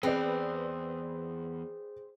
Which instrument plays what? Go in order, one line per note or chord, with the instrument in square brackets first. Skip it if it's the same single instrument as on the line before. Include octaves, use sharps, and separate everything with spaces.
[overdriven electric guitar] E2 [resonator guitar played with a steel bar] C4 [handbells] G#4 C5 [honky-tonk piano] B4 D5